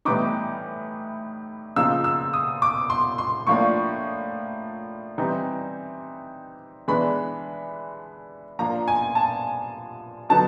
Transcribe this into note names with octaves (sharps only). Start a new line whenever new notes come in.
A2 E3 G3 B3 D#4 D6
C#3 F3 A#3 D#4 E6
E6
D#6
D6
C6
C6
A2 F3 A#3 D4 C#6
E3 G3 C4 D#4
E3 G#3 B3 D4 B5
F3 A#3 D4 A#5
G#5
A5
D3 F#3 B3 D#4 A5